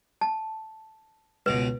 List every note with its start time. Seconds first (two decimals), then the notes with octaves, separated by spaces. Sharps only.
0.21 A5
1.46 C#2 B2 B4